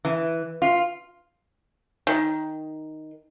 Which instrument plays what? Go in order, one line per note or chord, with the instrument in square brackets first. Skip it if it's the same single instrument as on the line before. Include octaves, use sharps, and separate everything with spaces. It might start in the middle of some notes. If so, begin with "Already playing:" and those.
[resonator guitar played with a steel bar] E3
F4
[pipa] D#3